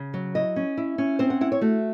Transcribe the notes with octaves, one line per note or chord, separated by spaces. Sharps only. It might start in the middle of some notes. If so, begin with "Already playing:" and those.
Already playing: C#3
F#3
E4 D#5
C#4
E4
C#4
C4 C5
F#5
E4 F#5
C#5
A3 F#4